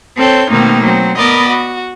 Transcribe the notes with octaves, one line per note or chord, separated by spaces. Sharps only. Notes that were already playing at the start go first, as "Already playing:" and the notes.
C4 A4 C#5 G6
B2 D#3 A3 A#3 C4 D#4
F#3 C4
B3 A#4 D5 D#5 B5
F#4